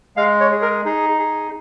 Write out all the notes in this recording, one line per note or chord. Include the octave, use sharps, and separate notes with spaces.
G#3 F5
C#5
G#4
A#4
D#4 G#4
G#4